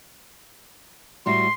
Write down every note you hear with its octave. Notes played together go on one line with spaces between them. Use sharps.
A2 G3 F#4 C6